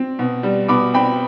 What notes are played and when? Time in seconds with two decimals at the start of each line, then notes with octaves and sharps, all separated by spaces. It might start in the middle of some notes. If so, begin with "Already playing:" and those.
Already playing: C4
0.19 B2
0.43 G3
0.68 B2 B5 D6
0.94 C4 G5 B5